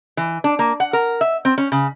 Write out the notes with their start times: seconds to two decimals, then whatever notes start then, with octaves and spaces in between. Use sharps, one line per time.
0.17 E3
0.44 D4
0.59 A#3
0.80 F#5
0.93 A#4
1.21 E5
1.45 C4
1.58 C#4
1.72 C#3